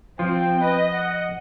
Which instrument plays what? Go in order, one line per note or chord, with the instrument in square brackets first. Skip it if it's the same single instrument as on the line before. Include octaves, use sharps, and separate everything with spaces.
[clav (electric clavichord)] F3 F4 [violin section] C4 [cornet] G5
[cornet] B4 [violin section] D#5
[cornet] F#5